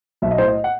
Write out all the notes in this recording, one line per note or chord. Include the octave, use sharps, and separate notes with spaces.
B1 E5
D#5
A2 C5
D#5
F#5